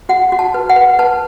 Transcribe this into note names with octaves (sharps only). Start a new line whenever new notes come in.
F#4 F#5
F#4
A5
B4
F#5
B4
B4 A5